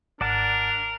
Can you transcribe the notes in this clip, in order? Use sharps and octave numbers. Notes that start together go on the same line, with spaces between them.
G#1 D4 A#4 D5 F#5 A5